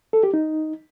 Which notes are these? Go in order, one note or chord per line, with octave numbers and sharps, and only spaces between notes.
A4
G4
D#4